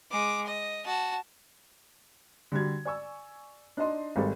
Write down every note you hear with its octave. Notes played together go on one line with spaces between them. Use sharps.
G#3 D6
D#5
F#4 A5
D3 G3 F#4 G#6
D5 G#5 C#6 E6
D4 D#4 D5 D#5 C6
G#1 G#2 G3 A4